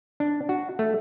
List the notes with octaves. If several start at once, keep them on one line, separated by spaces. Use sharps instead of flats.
D4
F#4
A3